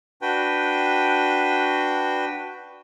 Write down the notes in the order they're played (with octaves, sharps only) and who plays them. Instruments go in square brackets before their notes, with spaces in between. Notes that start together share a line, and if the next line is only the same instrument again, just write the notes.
[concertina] D4 F#4 B4 G5